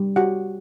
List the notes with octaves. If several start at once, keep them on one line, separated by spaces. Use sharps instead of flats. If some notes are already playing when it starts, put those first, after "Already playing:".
Already playing: G3
F#4 G4 F#5